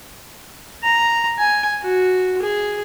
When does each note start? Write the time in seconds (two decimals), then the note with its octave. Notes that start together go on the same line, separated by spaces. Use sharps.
0.83 A#5
1.39 G#5
1.83 F#4
2.42 G#4